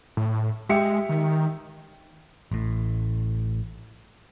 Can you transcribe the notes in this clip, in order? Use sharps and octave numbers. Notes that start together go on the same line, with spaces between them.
A2
G#3 G4 E5 C#7
D#3
A1 A2